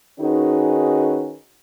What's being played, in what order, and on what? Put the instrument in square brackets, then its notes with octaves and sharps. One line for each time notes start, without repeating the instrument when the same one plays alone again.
[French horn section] D#3 C#4 D#4 F#4 G#4 B4